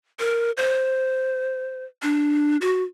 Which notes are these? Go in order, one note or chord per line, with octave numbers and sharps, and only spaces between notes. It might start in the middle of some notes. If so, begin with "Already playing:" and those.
A#4
C5
D4
F#4